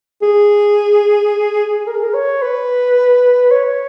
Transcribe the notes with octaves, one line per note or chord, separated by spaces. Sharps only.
G#4
A#4
G#4
A#4
C#5
B4
C#5